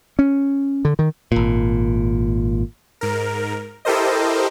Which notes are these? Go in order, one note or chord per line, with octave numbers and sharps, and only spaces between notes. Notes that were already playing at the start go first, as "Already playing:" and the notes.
C#4
D3
D#3
G#1 A#2
G#2 A#4
E4 G4 A4 A#4 C5 D#5